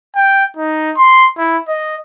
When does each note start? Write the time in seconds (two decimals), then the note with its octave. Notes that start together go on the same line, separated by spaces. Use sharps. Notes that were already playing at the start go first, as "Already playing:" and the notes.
0.16 G5
0.57 D#4
0.97 C6
1.38 E4
1.68 D#5